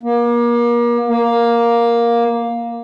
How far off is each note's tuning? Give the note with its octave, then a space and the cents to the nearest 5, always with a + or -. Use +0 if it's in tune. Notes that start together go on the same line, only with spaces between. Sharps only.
A#3 +35
A#3 +10